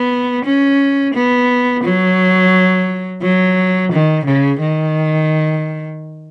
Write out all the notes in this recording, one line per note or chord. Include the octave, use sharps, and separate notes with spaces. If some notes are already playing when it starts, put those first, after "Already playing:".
Already playing: B3
C#4
B3
F#3
F#3
D#3
C#3
D#3